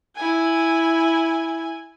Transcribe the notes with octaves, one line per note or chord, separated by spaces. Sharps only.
E4 G#5